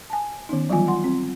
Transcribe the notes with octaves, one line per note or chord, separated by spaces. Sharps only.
G#5 A5
D#3 B3 C#4 D#4
E3 F#3 G3 B3 F4 G#5
F4 F#5 C6
C4